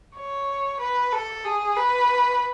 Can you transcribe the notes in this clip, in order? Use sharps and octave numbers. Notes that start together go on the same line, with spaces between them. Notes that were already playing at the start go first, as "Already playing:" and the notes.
C#5
B4
A4
G#4
B4